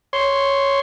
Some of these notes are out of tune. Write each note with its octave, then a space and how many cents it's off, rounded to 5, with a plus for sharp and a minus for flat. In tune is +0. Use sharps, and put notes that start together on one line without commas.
C#5 +0 C6 +0